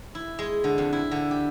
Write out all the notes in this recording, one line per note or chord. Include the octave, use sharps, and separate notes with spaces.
E4
G#3
D3
F2
E4
D3
G4